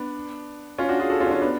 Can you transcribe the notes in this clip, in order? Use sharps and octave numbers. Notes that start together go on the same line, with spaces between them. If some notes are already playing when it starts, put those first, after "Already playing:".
Already playing: B3 D4
C#4 F4
D4 F#4
F4 G#4
F#4 A4
C#4 F4
D4
C#4 F4
B3 D4